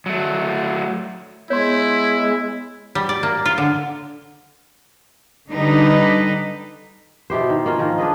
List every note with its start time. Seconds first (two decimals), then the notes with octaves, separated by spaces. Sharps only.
0.06 F#3 A3
1.50 G#3 B3 E4 C#5 C6
2.95 G3
3.09 D5
3.23 A#3
3.46 F4
3.58 D3
5.52 D3 G3 D#4 G4 B4
7.30 B2 E4 G4 C5
7.49 D#3
7.66 A#3 C#4 F4
7.79 D#3 F3
7.98 D4 G#4 B4 D#5